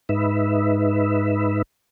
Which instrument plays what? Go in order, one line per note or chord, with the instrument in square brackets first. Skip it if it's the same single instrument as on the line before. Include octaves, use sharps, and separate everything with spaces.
[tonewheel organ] G#2 D#4 B4 E5